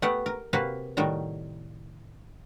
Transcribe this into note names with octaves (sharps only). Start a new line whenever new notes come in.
A3 B3 G4 B4 F#5
A#4
C3 A#3 F#4 B4 F5
A2 D#3 G3 F#4 A#5